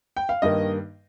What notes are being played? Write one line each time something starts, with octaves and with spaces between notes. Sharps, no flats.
G5
F5
G2 D#3 A#3 D#5